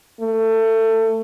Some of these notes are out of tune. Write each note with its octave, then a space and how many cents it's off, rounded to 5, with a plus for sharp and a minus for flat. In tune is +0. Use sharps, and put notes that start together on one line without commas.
A3 +25